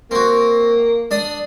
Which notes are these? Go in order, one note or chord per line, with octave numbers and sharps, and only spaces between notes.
A#3 C4 F#4
D4 D5 D#6